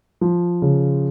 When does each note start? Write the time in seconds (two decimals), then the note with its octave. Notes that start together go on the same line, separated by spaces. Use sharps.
0.21 F3
0.62 C#3